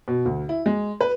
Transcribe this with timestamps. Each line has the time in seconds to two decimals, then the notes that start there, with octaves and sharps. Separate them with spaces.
0.08 B2
0.26 D2
0.49 E4
0.66 G#3
1.01 B4